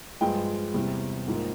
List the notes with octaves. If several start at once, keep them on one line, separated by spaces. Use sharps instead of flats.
G2 F3 G#3 G5
E2 C3 G3
G#2 F3 A#3